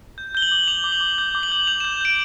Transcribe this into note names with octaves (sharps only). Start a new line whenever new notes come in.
G6
G6 G7
F#7
D6
D6 F7
D6
F#7
D6
G6
D6
F#7
G6
G6 F7
G6 E7
G6 D7